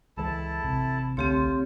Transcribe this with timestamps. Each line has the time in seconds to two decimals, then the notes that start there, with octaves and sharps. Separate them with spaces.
0.17 C#2 E3 G#3 E4 A4 A5
0.64 A1 C3
1.17 C#2 D3 A3 C4 F4 G4 C#5